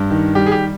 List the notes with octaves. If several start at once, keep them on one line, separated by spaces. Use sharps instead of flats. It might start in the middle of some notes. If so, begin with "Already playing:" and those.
Already playing: G2
D#3
G3 G4
G#4
G4